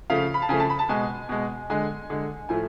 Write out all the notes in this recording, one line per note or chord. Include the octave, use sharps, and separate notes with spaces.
C#3 F3 A3 F5
B5
A5
C#3 F3 A3 G#5
A5
B5
A5
B2 G#3 G#5
B2 G#3
D3 G#3 G#5
D3 G#3
A2 F3 A3 G#5